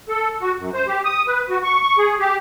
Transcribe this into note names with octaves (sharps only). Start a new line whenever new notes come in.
A4
F#4
F#2
C5
G4
D#6
B4
F#4
C#6
C#6
G#4
G4